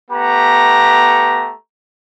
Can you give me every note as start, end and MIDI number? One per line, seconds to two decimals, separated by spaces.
0.11 1.52 57
0.11 1.52 59
0.11 1.52 67
0.11 1.52 82